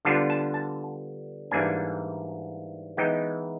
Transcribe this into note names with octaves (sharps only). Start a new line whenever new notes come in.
D3 G3 B3 D4 F4 A5
A5
A5
G#2 E3 G3 A#3 D4 G#5
E3 G#3 B3 D#4 G5